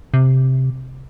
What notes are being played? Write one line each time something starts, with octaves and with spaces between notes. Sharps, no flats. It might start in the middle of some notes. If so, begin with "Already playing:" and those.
C3